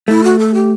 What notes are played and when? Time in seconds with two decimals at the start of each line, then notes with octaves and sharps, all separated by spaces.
0.08 A3 E4
0.24 F#4
0.39 A4
0.54 G4